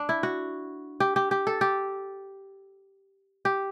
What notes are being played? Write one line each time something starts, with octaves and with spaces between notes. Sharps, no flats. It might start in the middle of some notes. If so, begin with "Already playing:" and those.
Already playing: D4
E4
F#4
G4
G4
G4
A4
G4
G4